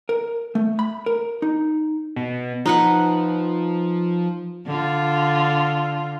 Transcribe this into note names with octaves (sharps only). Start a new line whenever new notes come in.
A#4
A3
B5
A#4
D#4
B2
F3 D#4 B4 F#5
D3 F4